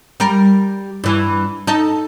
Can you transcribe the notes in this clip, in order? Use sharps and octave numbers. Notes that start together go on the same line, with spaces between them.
G3 G4 A#4
G2 E3
D#4 A4